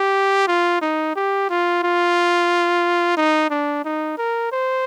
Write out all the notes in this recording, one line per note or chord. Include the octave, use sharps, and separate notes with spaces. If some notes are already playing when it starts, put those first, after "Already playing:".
Already playing: G4
F4
D#4
G4
F4
F4
D#4
D4
D#4
A#4
C5